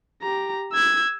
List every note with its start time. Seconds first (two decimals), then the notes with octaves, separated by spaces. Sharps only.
0.22 G4 A#5
0.73 E6 G#6